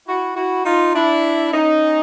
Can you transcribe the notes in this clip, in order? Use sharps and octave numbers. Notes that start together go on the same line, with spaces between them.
E4 F#4
E4 F#4
D#4 F4
D4 E4
C#4 D#4